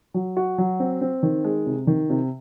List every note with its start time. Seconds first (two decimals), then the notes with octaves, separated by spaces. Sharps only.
0.14 F#3
0.37 F#4
0.58 F#3
0.80 C4
1.01 C4
1.23 D#3
1.44 G#3
1.66 C3
1.87 D#3
2.10 C3